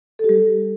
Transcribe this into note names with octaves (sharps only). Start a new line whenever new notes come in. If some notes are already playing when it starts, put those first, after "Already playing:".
G3 G4 A4